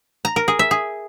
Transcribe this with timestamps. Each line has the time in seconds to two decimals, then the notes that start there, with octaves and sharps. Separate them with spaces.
0.25 A#5
0.36 A#4
0.48 G#4
0.59 E5
0.71 G#4